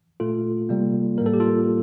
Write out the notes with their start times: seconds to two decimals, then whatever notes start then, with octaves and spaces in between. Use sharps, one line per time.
0.20 A#2 A3 F4 A4
0.69 C3 G3 A#3
1.18 A2 G3 A#3 A#4
1.26 A4
1.34 G4
1.40 F4 A4